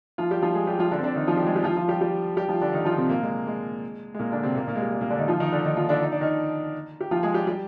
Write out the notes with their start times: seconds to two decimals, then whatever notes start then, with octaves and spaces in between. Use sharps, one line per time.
0.18 F3 F4
0.31 G3 G4
0.42 F3 F4
0.55 G#3 G#4
0.67 G3 G4
0.79 F3 F4
0.91 D3 D4
0.99 C4
1.03 D3 D4
1.15 D#3 D#4
1.27 F3 F4
1.37 G3 G4
1.46 G#3 G#4
1.55 G3 G4
1.64 F3 F4
1.77 F3 F4
1.88 G3 G4
2.01 G3 G4
2.37 G3 G4
2.49 F3 F4
2.61 D3 D4
2.73 D#3 D#4
2.85 F3 F4
2.97 C3 C4
3.09 A#2 A#3
3.23 G#3
3.47 G#3
4.14 G#3
4.19 A#2 A#3
4.32 D3 D4
4.43 C3 C4
4.55 A#2 A#3
4.67 A#2 A#3
4.75 G#3
4.81 G3
4.93 G#3
5.01 A#2 A#3
5.10 D3 D4
5.19 D#3 D#4
5.28 F3 F4
5.40 D#3 D#4
5.52 D3 D4
5.64 D#3 D#4
5.76 F3 F4
5.89 D3 D4
6.01 D#4
6.12 D4
6.21 D#3 D#4
7.01 G4
7.11 F3 F4
7.23 G#3 G#4
7.34 G3 G4
7.47 G3 G4